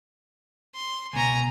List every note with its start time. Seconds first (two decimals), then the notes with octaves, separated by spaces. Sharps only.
0.75 C6
1.13 C#2 B2 G#5 A#5